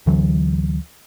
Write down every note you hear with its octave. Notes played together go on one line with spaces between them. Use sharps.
D2 D3 E3 F#3